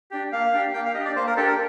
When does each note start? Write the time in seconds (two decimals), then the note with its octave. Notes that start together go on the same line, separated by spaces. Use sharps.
0.11 D4 G4
0.32 A#3 F5
0.53 D4 G4
0.74 A#3 G5
0.85 F5
0.94 D4 G4 D#5
1.05 D5
1.16 A#3 C5
1.27 A#4
1.37 D4 G4 A4
1.47 A#4